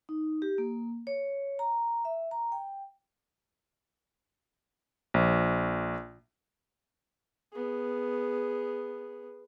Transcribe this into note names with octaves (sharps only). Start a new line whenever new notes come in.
D#4
G4
A#3
C#5
A#5
E5
A#5
G5
A#1
B3 G#4